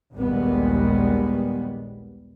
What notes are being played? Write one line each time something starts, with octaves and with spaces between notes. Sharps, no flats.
A#1 D#2 G3 G#3 B3